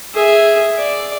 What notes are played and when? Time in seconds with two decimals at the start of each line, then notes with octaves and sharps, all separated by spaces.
0.15 G#4 E5
0.78 D5